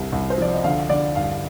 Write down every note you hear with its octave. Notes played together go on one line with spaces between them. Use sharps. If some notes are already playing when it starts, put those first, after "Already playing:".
Already playing: C2 C3
C2
C5
F3 D5
D#5
D3 F5
D3 D5
G2 F5